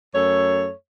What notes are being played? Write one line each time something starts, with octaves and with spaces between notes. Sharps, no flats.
F#2 A3 A4 C#5